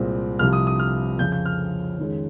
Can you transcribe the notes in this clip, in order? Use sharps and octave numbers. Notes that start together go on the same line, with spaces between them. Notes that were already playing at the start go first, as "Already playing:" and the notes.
Already playing: C2 A#2 G#3 C4
C2 C3 F3 F6
D#6
D#6
F6
F2 C#3 F3 G6
G6
F6
F2 D#3 G#3 C#4